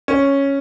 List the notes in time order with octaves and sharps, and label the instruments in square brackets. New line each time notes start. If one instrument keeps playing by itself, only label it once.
[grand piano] C#4